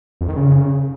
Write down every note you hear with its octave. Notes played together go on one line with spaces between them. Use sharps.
F2
D#3
C#3